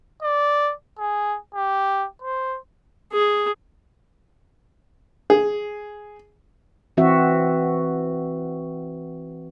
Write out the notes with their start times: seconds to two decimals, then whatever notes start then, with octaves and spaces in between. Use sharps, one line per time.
0.23 D5
0.99 G#4
1.55 G4
2.22 C5
3.13 G#4
5.30 G#4
6.97 E3 C4 F#4 E5